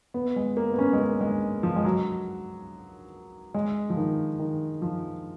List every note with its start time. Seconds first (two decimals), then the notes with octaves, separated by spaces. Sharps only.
0.14 B3
0.36 G#3
0.57 A#3
0.74 B3
0.79 C#4
0.93 G#3
0.99 A#3
1.21 G#3
1.63 F3
1.76 G#3
1.85 F#3
3.54 G#3
3.90 F3
3.97 D#3
4.39 D#3
4.82 F3